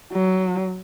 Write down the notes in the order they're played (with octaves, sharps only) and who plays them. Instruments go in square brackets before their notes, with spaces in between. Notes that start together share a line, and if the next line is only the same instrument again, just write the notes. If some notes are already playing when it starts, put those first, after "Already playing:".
[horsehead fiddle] F#3